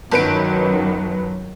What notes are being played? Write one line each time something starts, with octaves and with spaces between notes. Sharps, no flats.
G1 F#2 D#3 F#3 B4 D7